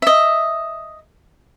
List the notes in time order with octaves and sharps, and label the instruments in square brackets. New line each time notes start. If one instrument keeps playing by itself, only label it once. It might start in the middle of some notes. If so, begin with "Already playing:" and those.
[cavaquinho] D#5 E5